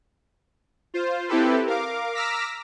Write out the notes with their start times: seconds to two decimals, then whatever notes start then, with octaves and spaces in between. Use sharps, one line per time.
0.94 F4 C5
1.28 C4 E4 G4 A4 B4
1.67 A#4 F5 D6
2.15 A#5 D6 E6 F6 A#6 B6